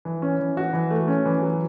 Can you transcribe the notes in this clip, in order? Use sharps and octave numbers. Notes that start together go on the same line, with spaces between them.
E3
C#4
E3
F#4
E3
A3
C#4
E3
F#3